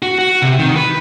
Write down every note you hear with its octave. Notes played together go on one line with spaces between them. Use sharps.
F#4
F#4
C3
D#3
B4